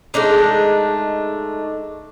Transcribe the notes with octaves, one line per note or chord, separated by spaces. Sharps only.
G#3 A3 D4 D#4